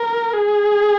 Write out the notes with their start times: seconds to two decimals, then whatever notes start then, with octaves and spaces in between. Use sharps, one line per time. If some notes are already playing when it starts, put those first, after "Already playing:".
Already playing: A#4
0.33 G#4